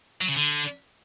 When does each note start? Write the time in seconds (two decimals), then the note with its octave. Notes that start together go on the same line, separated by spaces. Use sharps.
0.21 F#3
0.29 C#3
0.36 D3